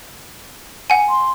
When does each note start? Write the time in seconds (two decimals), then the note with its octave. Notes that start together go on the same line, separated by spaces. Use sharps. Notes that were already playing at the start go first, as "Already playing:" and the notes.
0.90 F#5 G#5
1.09 C6